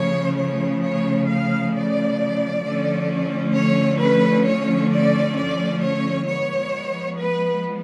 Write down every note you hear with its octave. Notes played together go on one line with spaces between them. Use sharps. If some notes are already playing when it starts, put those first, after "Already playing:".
Already playing: C#3 F3 A3 C#5
C#5
C#5
F5
D5
D3 F3 A3 C#4
C#5
B4
C#5
D5
D5
C#5
F3 G#3 B3 C#5
B4